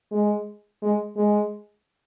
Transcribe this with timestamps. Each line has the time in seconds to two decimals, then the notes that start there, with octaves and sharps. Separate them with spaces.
0.12 G#3
0.82 G#3
1.16 G#3